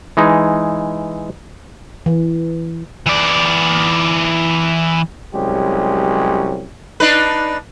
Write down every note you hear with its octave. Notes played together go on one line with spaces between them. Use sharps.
E3 G#3 D#4
E3
E3 D5
C2 F#3 G#3 C#4 G4
D4 D#4 B4